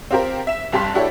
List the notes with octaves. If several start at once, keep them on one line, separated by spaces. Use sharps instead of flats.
C4 F4 G4 A#4 C5
E5 E7
F1 G2 G4 A5 C6 B6
D4 E4 F#4 G4 A4 C#5